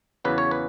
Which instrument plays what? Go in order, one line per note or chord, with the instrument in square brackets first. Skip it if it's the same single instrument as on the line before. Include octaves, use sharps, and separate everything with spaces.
[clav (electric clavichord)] E2 C#3 F#3 C#4 B4
C#5
B4